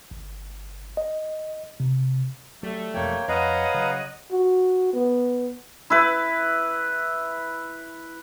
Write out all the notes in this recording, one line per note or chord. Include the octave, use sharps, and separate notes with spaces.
G1
D#5
C3
F#3 G3 A3
E1 F2 F3 A#3 C#5 G5
F2 B4 C#5 D#5 F5 F#5 A#5
C#3 F#3
F#4
B3
E4 B4